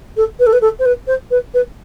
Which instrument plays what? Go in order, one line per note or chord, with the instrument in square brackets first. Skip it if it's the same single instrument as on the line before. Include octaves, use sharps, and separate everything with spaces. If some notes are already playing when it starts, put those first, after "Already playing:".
[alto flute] A4
B4
A4
B4
A4
C5
B4
C5
B4
B4